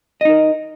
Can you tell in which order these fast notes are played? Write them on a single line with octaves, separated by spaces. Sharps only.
D#5 D#4 A#4